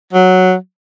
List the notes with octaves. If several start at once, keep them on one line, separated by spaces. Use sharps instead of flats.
F#3